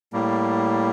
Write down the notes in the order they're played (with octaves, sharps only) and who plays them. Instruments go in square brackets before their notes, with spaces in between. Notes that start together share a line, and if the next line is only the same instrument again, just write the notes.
[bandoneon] A2 G3 A#3